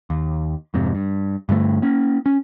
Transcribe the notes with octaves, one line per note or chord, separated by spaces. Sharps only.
D#2
F2 G#2 C3
G2
G2 D3 G#3 A3
A#3 C#4
C#4